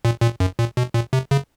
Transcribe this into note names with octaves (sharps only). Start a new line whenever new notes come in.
A#2
A#2
F#2
A#2
B2
A#2
C3
C#3